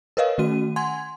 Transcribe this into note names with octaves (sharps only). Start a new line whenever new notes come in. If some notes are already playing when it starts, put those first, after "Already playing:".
A#4 B4 C#5 D#5 F5
D#3 A3 C#4 F#4 D#7
F#5 G#5 C6 G#6